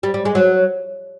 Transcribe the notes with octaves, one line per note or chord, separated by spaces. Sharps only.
G3
G3
G#3
F#3